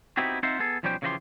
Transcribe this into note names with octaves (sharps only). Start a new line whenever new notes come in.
B3 C4 D#4 E4 F#4 G4
C4 D#4 F4 C5 E5 F#5
B3 G#4 A4
B1 F3 G3 C#4 C5 G5
C#3 E3 F3 F#4 G4 C6